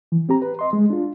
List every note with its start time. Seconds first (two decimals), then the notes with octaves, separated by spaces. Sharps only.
0.12 E3
0.29 C4 G4 A#5
0.42 B4
0.59 D#5 C6
0.73 G#3
0.90 D4 F4